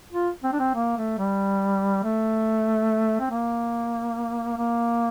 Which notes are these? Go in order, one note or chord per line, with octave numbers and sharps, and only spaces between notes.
F4
C4
D4
C4
A#3
A3
G3
A3
C4
A#3
A#3